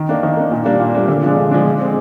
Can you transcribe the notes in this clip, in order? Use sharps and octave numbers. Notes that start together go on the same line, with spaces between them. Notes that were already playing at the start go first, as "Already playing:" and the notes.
Already playing: D#3
A#3 D4
D#3
A#3 D4
A#2
G3 A#3 D4
A#2
G3 A#3 D4
D3
F3 G#3 D4
D3
F3 G#3 D4
D3
G#3 C4